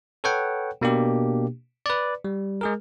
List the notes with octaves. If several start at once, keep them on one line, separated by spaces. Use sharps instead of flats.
A4 B4 C#5 F#5 G5
B2 A#3 D4 G4
B4 D5
G3
G#3 G#4 A#4